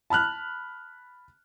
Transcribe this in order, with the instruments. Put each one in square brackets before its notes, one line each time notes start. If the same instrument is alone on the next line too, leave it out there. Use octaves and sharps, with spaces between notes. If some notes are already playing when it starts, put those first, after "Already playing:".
[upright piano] A5 B5 F6 F#6